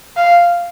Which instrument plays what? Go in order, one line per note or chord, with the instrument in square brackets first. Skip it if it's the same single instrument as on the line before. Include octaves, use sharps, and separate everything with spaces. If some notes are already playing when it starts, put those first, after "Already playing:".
[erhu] F5